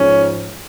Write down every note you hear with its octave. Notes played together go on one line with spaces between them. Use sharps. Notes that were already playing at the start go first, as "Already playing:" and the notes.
Already playing: G#2 F3 C#4